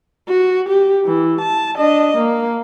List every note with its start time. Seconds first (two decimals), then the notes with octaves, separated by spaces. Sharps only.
0.28 F#4
0.69 G4
1.05 E3
1.41 A5
1.77 D4 D#5
2.17 A#3